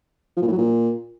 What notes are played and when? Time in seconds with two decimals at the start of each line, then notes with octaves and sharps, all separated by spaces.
0.37 F3
0.42 A#2
0.47 A2
0.52 F#3
0.58 A#2